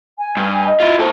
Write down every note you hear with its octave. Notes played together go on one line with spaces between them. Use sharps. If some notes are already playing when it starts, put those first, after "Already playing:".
G#5
G2
D#5
E4 F4
A#2 A4 C5